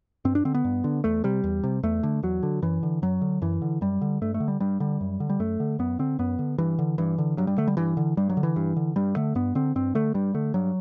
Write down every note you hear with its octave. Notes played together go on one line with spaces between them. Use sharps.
G2 C4
D4
D3 C4
B3
G2
D3
E2 A3
C3 G3
E2
C3
E2 A3
D3
E2 F#3
D3
F#2 E3
D3
F#2 F#3
D3
F#2 E3
D3
F#2 G3
D3
G2 A3
A3
D3
G3
G2 G3
D3 G3
F#2
D3
G3
F#2 A3
D3
F#2 B3
D3 C4
F#2 B3
D3
G2 E3
D3
G2 E3
D3
G2 F#3
G3
D3 A3
G3
G2 E3
D3
G2 G3
F#3
D3
E3
G2
D3
G2 G3
D3 A3
G2 B3
D3 C4
G2 C4
D3 A3
G2 G3
D3 A3
G2 F#3